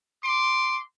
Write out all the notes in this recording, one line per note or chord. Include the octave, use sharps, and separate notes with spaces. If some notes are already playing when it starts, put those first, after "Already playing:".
C6 D6